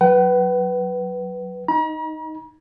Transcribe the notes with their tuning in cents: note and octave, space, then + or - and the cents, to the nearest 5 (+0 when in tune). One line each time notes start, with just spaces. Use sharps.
F#3 +0 B4 +0 F#5 +45
D#4 +0 A#5 +45